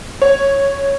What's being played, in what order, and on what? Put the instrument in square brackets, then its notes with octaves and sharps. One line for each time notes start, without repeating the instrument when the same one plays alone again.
[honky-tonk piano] C#5